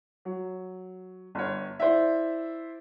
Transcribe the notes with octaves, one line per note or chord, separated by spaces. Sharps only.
F#3
G1 C#5
E4 C5 D5 E5